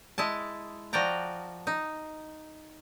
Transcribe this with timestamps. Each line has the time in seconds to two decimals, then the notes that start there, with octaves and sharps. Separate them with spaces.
0.18 G#3 E4 D#5 A5
0.93 F3 F#4 D5 G5 A#5
1.67 D#4